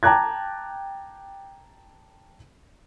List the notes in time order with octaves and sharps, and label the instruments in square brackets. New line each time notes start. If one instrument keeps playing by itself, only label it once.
[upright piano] G5 A5 A#5 D6 F#6 G#6